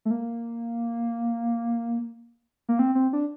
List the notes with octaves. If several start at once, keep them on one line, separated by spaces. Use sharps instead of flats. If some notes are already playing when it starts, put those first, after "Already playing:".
A3
A#3
A#3
C4
C4
D4